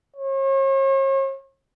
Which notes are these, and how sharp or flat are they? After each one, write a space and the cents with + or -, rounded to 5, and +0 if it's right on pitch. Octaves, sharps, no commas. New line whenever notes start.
C#5 -40